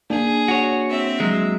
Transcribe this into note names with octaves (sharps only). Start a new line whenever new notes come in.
A#3 D4 G#4
F#4 C#5
C4 E5
F#3 G#3